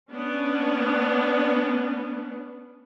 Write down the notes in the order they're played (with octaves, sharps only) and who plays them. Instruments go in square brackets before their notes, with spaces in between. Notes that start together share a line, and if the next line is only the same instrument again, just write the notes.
[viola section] B3 C#4 D4